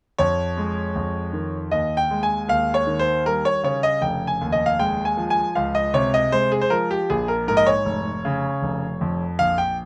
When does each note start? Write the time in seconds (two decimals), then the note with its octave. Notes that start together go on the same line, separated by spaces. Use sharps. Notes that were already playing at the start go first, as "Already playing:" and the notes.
0.18 F2 C#5
0.57 G#3
0.96 F2
1.33 D#3
1.71 D#2 D#5
1.97 G5
2.11 G#3
2.23 G#5
2.48 D#2 F5
2.74 C#5
2.87 D#3
2.99 C5
3.25 G3 A#4
3.45 C#5
3.63 C#3 C#5
3.83 D#5
4.02 F1 G5
4.27 G#5
4.41 D#2
4.52 D#5
4.66 F5
4.79 G#3 G5
5.05 G#5
5.17 F3
5.30 G#5
5.55 C#2 F5
5.75 D#5
5.94 C3 C#5
6.14 D#5
6.32 G#3 C5
6.52 G#4
6.61 C5
6.70 F3 A#4
6.91 G4
7.10 A#1 G#4
7.28 A#4
7.48 G#2 A#4
7.57 D#5
7.67 C#5
7.85 F1
8.25 C#3
8.62 F1
9.01 F2
9.39 A#1 F5
9.58 G5